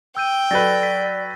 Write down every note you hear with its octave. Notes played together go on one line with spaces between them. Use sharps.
G5 E6 G6 D#7
F#3 A4 B4 D5 A6 A#6
B6